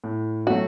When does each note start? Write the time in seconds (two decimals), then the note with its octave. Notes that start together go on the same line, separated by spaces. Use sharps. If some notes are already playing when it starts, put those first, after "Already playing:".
0.04 A2
0.47 F#3 A3 F#4